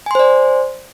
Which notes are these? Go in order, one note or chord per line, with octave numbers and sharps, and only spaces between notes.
C5 D5 G#5 C6